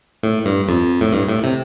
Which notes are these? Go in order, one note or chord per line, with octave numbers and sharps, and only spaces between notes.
A2
G2
F2
A2
G2
A2
C3